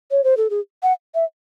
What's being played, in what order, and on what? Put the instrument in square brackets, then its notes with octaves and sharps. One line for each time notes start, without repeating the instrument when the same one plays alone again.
[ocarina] C#5
C5
A4
G#4
F#5
E5